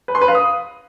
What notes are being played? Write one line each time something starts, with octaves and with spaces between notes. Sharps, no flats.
B4
C6
B4
F5
D#6